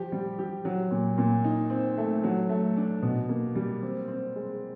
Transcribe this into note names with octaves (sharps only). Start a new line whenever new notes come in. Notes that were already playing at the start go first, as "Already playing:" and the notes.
Already playing: F3 G4
G3
G4
F#3
A#2
A#2
D#4
C4
A3
F#3
A3
D4
B2
A#3
G3
C4
C4
G#3